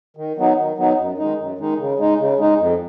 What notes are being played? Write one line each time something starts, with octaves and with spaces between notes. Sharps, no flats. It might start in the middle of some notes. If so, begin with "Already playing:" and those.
D#3
F#3 B3 D#4
D#3
F#3 B3 D#4
F#2
D#3 G#3 D#4
F#2
D#3 G#3 D#4
C#3
G#3 D#4
C#3
G#3 D#4
F2